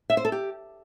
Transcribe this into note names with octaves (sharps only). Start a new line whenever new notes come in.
E5
C5
A4
G4